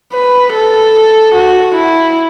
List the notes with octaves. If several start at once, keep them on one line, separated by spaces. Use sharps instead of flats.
B4
A4
F#4
E4